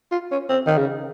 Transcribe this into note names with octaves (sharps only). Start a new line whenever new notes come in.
F4
C#4
C4
D#3
C#3